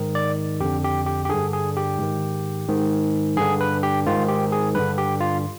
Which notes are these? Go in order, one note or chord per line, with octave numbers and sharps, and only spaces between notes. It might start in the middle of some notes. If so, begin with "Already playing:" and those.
Already playing: G#2 D#3
D5
F2 D3 G4
G4
G4
G4
G2 D3 G#4
G#4
G4
G#2 D#3
G#2 D#3
G2 D3 G#4
B4
G4
G#2 D#3 F4
G4
G#4
G2 D3 B4
G4
F4